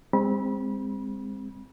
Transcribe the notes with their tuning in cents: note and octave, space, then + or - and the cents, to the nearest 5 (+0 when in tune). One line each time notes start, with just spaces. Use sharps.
G#3 -35 C4 +0 B5 -30